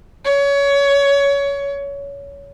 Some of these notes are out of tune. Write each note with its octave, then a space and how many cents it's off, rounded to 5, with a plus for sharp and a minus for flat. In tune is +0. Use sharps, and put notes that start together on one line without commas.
C#5 +20